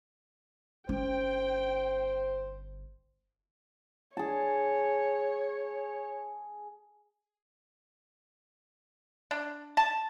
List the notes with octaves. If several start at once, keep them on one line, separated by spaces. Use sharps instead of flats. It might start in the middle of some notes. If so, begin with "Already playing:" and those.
G1 C#4 C5 G5
G#4 C#5 A5
D4
A5